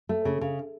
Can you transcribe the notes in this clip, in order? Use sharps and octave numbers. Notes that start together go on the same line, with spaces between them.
A3
C#3
C#3